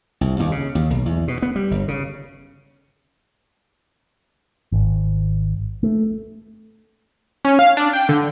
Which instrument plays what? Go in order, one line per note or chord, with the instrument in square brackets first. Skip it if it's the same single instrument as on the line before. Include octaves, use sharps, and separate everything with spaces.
[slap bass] C2
D#2
C#3
D#2
B1
E2
B2
B3
G3
G1
C#3
[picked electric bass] G#1
A3
[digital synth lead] C#4
F5
D4
G5
D3